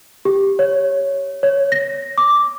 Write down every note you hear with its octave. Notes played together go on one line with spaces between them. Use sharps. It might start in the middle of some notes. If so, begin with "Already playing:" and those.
G4
C#5
C#5
A#6
D6